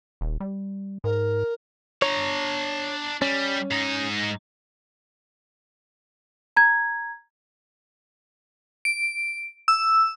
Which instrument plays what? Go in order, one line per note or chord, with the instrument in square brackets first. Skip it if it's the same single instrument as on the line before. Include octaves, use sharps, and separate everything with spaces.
[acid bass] D#1
G3
[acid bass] G#2 [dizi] A#4
[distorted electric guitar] D4 A#5 [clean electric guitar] C#5
[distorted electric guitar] G3 [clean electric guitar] C#4
[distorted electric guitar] G#2 D#4
[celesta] A#5 G#6
[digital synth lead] D7
E6